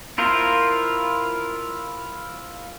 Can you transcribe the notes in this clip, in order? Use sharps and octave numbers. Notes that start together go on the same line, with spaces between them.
E4 F4 A#4 C5